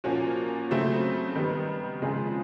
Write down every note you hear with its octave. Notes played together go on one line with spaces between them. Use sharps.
A#2 F3 A#3 C#4 F#4
C#3 F#3 A3 C4
D#3 G3 B3
C#3 F3 G#3 C4 F4